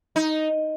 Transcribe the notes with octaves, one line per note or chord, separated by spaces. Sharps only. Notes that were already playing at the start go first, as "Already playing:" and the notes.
D#4